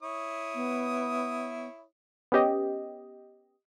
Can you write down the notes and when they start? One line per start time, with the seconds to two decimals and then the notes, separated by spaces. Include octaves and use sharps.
0.03 E4 C#5 D#6
0.55 B3
2.32 B3 C#4 G4 D#5